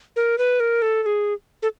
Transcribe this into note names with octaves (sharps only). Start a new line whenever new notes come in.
A#4
B4
A#4
A4
A4
G#4
A4